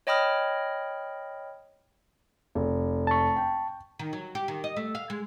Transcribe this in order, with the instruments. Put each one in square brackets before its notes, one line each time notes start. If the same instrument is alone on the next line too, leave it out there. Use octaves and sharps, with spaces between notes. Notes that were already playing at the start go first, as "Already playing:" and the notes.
[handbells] C#5 D#5 G5 B5 D#6 F6
[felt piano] F1
[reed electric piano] A5 C#6
[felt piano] G5
[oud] D#3
F#3
G4
D#3
D#5
A3
F5
G#3